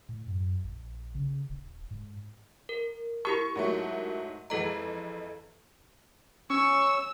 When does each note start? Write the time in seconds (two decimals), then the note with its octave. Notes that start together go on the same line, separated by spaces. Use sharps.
0.09 A2
0.27 F#2
0.64 A#1
1.15 C#3
1.49 D#1
1.91 G#2
2.69 A#4
3.25 E4 G4 A#4 C#6
3.55 G#2 F#3 A3
4.50 F2 E3 G#3 A4 A#5
6.50 C#4 C#6 E6